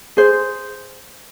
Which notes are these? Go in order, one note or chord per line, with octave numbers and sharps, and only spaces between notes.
G#4 C5